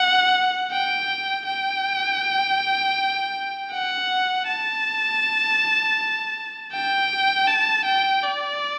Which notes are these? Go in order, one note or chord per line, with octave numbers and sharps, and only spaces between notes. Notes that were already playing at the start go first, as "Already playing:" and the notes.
Already playing: F#5
G5
G5
F#5
A5
G5
A5
G5
D5